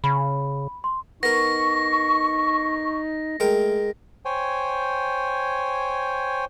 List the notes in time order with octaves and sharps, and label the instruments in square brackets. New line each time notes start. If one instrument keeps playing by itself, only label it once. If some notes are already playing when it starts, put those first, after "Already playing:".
[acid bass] C#3 [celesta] B5
[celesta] C6
[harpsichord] B3 A#4 [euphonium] D#4 [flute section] C#6 [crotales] A#6
[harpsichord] G#3 A#4 G5 [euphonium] A3
[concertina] C5 C#5 G5 G#5